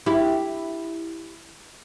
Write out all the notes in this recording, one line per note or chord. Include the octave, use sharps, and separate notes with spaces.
E4 G4